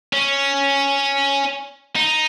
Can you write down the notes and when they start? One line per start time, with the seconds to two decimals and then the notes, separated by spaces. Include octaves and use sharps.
0.13 C#4
1.96 D#4